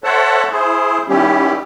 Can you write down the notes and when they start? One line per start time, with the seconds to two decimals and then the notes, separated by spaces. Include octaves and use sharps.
0.04 A4 C5 C#5 E5 F#5 A5
0.51 E4 G#4 C5
1.09 D#3 G3 B3 C#4 E4 G4